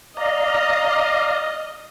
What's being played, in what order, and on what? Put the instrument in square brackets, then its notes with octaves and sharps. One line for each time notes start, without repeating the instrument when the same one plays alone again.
[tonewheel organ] D5 F5 A#5 [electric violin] D#5